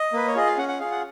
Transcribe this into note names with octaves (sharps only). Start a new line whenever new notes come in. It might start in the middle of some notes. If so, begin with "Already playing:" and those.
Already playing: D#5
A#3 B4
C#5
F4 G#4 D#5
F5
C#4 F#5
F#5
F4 G#4 F5
F#5